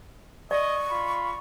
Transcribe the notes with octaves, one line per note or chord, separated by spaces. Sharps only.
D5 D#5 C#6
F4 B5